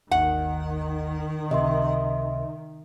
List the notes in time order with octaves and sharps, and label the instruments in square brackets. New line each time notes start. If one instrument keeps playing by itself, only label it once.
[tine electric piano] G#1 D#2 [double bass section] D#3 [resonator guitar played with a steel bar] F#5
[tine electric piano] C#2 C3 [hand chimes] D#5 E5 C6